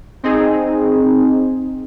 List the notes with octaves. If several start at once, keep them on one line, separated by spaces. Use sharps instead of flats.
C4 D#4 G#4